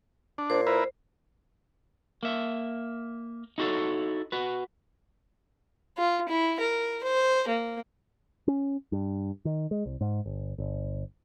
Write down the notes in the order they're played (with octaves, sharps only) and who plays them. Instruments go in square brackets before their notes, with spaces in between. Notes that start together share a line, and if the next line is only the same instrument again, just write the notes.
[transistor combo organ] D4
[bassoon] A#2 [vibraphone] C5
[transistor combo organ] E4 A#4 B4
[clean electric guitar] A#3 E5
D#4 E4 F#4 G4 A4 C#5
F#4 B4
[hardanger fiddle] F4
E4
A#4
C5
A#3
[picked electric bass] C#4
G2
D#3
G#3
C2
G#2
G1
G1